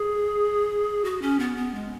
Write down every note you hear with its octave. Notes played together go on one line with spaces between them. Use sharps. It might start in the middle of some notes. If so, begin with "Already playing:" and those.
Already playing: G#4
F#4
C#4
B3
B3
G#3